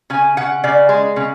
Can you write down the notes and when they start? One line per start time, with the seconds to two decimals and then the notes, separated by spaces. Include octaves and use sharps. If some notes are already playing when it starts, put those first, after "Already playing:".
0.10 C#3 G#5
0.37 C#3 F#5
0.64 C#3 D5
0.89 G#3
1.16 C#3